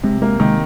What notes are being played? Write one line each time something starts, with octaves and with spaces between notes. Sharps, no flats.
C3 G#3
G#3 A#3
D#3 G#3